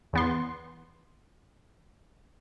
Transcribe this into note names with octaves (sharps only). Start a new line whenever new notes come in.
E2 B3 C6